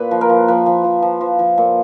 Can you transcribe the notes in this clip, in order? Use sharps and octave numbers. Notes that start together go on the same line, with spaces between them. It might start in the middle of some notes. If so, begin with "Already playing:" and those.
Already playing: A#2 B4
F3
A#4
F3
F3 B4
F3
F3
F3
F3
F3
A#2